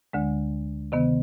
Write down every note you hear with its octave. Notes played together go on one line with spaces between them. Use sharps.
D2 D3 G#3
C3 D#3 B3